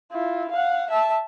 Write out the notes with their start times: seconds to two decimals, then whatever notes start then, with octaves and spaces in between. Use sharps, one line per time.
0.12 E4 F4
0.51 F5 F#5
0.90 E5 A5